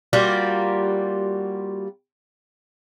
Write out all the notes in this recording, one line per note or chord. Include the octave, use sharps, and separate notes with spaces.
G3 A#3 F4 F#4